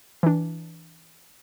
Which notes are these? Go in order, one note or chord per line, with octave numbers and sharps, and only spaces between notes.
E3 D4